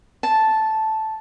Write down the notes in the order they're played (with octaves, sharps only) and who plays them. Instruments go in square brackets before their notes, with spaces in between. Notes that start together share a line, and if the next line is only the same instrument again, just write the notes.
[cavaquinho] A5